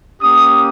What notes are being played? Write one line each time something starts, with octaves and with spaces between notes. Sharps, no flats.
A#3 C#4 G4 D#6